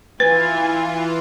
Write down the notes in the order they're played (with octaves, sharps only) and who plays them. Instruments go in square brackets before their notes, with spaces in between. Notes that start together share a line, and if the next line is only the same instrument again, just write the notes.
[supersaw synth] E3 F4 [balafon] B4 [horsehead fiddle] G#5 [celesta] A6